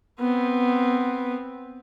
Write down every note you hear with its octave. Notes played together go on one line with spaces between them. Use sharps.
B3 C4